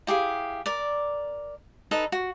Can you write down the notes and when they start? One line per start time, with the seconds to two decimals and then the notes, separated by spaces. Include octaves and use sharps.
0.07 E4 G4 G#4 F5
0.66 A#4 D5
1.91 D#4 A4 B4
2.12 F#4